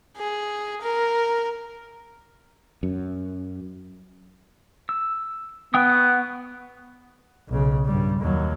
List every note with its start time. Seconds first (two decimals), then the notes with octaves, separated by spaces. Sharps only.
0.17 G#4
0.82 A#4
2.83 F#2
4.89 E6
5.74 B3 F#5 G5 D#6
5.89 F#5 C#6
7.49 B1 C#3
7.86 G2 G3
8.20 D#2 F#3